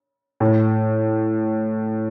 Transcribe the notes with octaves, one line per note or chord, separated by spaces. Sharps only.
A2